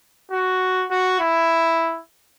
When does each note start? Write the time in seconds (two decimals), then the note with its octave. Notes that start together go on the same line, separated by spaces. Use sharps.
0.32 F#4
0.91 F#4
1.20 E4